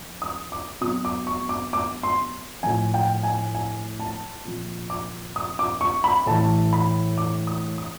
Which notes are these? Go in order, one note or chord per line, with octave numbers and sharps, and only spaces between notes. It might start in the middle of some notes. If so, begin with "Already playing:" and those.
Already playing: F3
D#6
D6
B2 F#3 D#6
D6
C#6
D6
D6
C6
A2 F3 G#5
G5
G#5
G#5
A5
A#2 F3
D6
D#6
D6
C#6
B5
A2 E3 A5
B5
D6
D#6
D#6